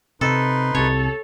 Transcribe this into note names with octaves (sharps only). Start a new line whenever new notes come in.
C3 D#4 A4 B4 C6
C2 C3 A4 C#5